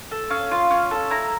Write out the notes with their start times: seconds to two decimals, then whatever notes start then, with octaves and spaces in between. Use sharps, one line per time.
0.11 A4
0.30 C#4 F5
0.51 F4
0.71 C#4
0.91 A4
1.10 E4 A#5